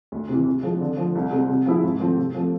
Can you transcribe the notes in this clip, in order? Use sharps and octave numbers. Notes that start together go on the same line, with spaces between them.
D2
C3 E3
C3
F3 G#3
D3
F3 A3
C2
C3 G#3 C4
C3
F3 B3 E4 G#4
G#2
F3 A3 C4
C3
F3 A3